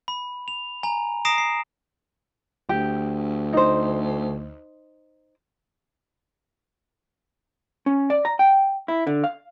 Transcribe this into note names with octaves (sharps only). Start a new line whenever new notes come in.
B5
F7
G#5 A#5
A#5 D#6 A#6 C7 D7 E7
C7
D2 G4
D#4 C5
C#4
D5
A#5
G5
E4
D3
F5